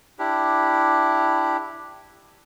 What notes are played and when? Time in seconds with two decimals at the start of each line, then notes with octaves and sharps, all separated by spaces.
0.19 D4 E4 G4